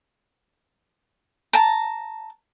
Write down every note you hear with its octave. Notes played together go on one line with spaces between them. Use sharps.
A5 A#5